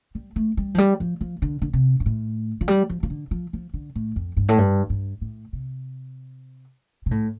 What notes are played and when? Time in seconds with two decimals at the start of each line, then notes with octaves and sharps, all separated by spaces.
0.15 G3
0.36 A3
0.57 G3
0.75 F3
0.78 G3
1.00 F3
1.21 F3
1.42 D3
1.62 D3
1.73 C3
2.00 G2
2.06 A2
2.61 F3
2.68 G3
2.89 F3
3.03 F3
3.10 D3
3.31 F3
3.53 F3
3.74 D3
3.95 A2
4.16 F2
4.37 G2
4.49 A2
4.58 G2
4.90 G2
5.21 A2
5.53 C3
7.06 C3
7.11 A2